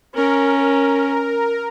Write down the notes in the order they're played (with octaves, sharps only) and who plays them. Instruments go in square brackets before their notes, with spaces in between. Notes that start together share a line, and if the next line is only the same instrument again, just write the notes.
[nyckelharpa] C#4 [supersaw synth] A#4